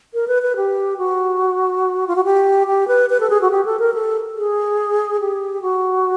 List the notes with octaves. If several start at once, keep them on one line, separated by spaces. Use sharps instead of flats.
A#4
B4
B4
G4
F#4
F4
F#4
G4
G4
B4
B4
A4
G#4
F#4
G4
A4
A#4
A4
G#4
G4
F#4